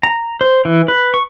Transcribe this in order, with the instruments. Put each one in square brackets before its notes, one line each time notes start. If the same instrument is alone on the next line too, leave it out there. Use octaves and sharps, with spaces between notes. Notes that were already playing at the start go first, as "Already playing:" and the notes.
[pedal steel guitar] A#5
C5
E3
B4
C#6